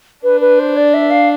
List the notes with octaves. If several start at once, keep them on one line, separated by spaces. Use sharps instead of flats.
D4 B4
B4
C5
D5
E5
F5